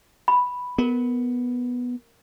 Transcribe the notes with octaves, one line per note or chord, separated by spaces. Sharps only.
B5
B3 A#4